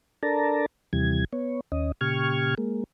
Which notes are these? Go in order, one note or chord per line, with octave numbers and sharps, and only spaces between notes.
D4 A4 A#4 D5 A5 A#5
D#2 C3 E3 G3 G#6
B3 C#5
D#2 C#4 D#5
A#2 C#3 G4 C#6 F6 G#6
G#3 A#3